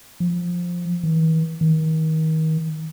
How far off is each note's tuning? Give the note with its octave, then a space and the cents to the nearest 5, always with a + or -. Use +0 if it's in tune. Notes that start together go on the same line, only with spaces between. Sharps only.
F3 +5
E3 -45
D#3 +30